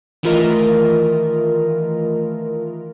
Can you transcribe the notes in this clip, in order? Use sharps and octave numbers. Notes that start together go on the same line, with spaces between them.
D#3 E3 A3 F4 A#4 D#5